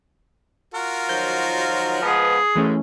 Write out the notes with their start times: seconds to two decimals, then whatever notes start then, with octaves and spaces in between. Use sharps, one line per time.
0.74 F4 F#4 A#4
1.09 D#3 F3 F#3 G6
2.02 F3 G#3 B3 G#4
2.56 F#2 E3 G#3 A3 C#4